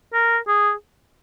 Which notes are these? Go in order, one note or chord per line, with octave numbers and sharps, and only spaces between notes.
A#4
G#4